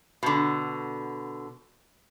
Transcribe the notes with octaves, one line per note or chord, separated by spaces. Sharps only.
B2 D3